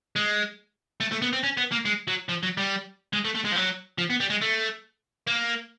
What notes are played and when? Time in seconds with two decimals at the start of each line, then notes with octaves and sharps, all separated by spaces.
0.16 G#3
1.00 A3
1.12 A3
1.22 B3
1.33 C4
1.43 C#4
1.57 B3
1.72 A#3
1.85 G#3
2.08 F#3
2.29 F3
2.43 F#3
2.57 G3
3.13 G#3
3.25 A3
3.35 A3
3.45 G#3
3.52 F3
3.56 F#3
3.98 F3
4.10 B3
4.20 G3
4.30 G#3
4.42 A3
5.27 A#3